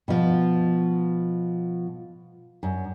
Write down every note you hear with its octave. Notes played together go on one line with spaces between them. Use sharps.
B2 F3
F#2